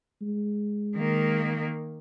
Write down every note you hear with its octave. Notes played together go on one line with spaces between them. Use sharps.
G#3
D#3 A#3